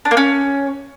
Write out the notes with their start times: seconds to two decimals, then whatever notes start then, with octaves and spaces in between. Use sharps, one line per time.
0.05 D4
0.11 A#3
0.17 C#4